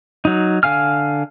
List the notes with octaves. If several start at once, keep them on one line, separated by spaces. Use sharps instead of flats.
F#3 D#4
D3 F5 G#5 F6